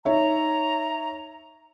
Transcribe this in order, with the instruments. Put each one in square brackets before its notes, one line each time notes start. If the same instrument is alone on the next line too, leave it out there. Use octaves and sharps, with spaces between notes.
[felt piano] D#4 C#5 E5 [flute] A#5